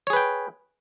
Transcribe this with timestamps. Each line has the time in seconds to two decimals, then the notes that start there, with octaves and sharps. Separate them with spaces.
0.07 C#5
0.10 G#4
0.13 B4
0.16 G5